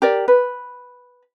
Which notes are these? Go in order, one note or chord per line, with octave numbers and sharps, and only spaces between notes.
G4 A#4 D5
B4